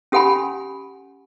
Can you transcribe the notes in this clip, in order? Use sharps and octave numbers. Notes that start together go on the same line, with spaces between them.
C#4 G4 A4 F#5 G#5 B5